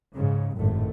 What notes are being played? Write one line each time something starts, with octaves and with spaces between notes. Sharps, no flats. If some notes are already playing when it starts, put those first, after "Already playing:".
G#2 C#3
G#1 F#2 A2 A3